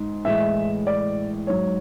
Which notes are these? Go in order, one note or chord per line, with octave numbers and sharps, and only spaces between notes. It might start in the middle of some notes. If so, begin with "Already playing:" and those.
Already playing: G#2
A2 E3 G#3 E5
D5
G#2 F#3 C#5